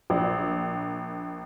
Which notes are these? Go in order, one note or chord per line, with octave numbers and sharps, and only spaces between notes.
A#1